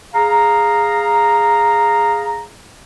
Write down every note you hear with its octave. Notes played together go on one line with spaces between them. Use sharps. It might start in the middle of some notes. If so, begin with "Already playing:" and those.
G#4 F5 A#5